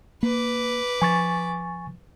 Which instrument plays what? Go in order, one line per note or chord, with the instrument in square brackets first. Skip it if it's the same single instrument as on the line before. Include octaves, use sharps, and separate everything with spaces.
[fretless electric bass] A#3 [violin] B4 D6
[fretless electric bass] F3 [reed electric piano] G#5 C#6 A6